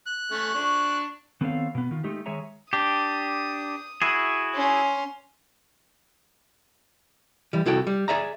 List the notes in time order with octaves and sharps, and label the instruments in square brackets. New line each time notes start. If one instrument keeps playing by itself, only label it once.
[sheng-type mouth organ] F#6
[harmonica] A3 C#4
D4 C#6
[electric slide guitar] D#3 B3 C4 A4 C#5 F5
B2 B3
D#3 F4
G#3 A3 D#4 G4
D#3 G#3 G#4 C#5 E5 A#5
[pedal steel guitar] D4 G4 [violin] D#6
[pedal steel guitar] E4 F#4 G#4
[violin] C#4 C6
[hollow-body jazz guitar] E3 G3
C2 E4 F#4 A4 G5
G3
G#4 D5 E5 A#5